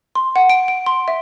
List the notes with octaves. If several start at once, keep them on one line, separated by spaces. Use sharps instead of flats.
C6
F#5
D7
D7
C6
E5